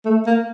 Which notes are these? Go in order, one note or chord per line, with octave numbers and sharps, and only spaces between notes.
A3
A#3